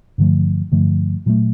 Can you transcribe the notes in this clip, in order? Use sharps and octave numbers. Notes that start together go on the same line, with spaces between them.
G2 D3 F3 A3
G2 D3 F3 A3
A#2 F#3 A3